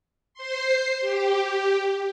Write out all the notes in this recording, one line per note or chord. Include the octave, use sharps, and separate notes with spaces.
C5 C6
G4